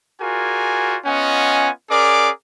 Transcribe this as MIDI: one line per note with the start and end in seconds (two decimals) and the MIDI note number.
0.21 0.97 65
0.21 0.97 66
0.21 0.97 68
0.21 0.97 70
0.21 0.97 74
0.21 0.97 80
1.06 1.70 59
1.06 1.70 61
1.06 1.70 65
1.06 1.70 75
1.06 1.70 78
1.06 1.70 80
1.90 2.30 61
1.90 2.30 68
1.90 2.30 70
1.90 2.30 74
1.90 2.30 78
1.90 2.30 86